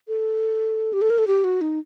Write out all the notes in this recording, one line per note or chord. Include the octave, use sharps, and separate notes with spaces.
A4
G4
A4
A#4
A4
G4
F#4
D#4